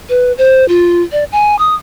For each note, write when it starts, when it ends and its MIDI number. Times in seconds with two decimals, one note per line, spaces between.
0.09 0.32 71
0.38 0.67 72
0.69 1.02 65
1.12 1.24 74
1.32 1.58 80
1.59 1.75 87